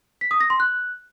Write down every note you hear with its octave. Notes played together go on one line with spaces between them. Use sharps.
B6
D#6
A#6
C6
F#6